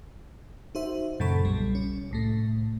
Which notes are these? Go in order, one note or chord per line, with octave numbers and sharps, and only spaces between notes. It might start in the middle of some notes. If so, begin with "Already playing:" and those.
D#4 F#4 C5 E5
F#2 A#2 C#3 A4 B5 C#6
B1 B2 G3
C#4
C2 A2 A3